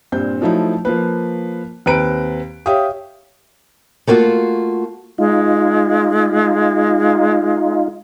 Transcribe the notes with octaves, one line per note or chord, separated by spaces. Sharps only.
G2 A#2 C4 G6
F3 F#3 A3 D#4 E4
F3 A#3 B4
D#2 C4 B4 A#5 D7
G4 C#5 E5 F5 G5 D#6
A3 A#3 F4 F#4
G#3 D#4 F4